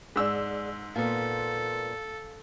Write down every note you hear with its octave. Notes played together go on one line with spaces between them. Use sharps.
G#2 G#4 D5 E6
A#2 B3 A4 F5